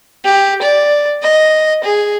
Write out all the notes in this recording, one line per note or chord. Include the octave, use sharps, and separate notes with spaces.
G4
D5
D#5
G#4